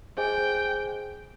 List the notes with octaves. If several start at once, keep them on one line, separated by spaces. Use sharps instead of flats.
G#4 C5 D#5 G5 G#5